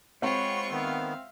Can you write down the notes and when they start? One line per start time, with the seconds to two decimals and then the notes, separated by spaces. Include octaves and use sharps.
0.22 G#3 C4 F4 C#5 F#5 B5 C#6 C#7
0.71 D#3 B3 E5 F5